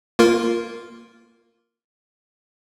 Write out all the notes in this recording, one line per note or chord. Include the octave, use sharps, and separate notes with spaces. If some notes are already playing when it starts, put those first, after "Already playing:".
A#3 F4 A#4